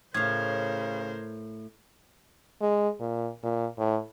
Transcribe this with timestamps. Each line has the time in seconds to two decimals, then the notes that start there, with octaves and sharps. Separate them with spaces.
0.14 A2 C#3 A#4 C5 F5 G#6
2.61 G#3
3.00 A#2
3.43 A#2
3.78 A2